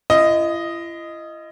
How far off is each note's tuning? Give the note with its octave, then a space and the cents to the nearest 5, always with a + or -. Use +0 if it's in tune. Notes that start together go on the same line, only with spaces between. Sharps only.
E4 +45 D#5 +0